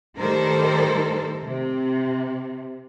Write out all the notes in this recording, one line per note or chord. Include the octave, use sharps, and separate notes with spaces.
A2 D#3 G3 A4 A#4 C5
C3